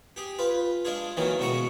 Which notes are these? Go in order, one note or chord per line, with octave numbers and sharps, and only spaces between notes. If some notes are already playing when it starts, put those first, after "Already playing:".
G4 G#4
F4 B4
G#3 D4 F4 G#4
D#3 E3 F#3 A#3 C#4
C#2 B2 G#3 F#4 A#5 C#6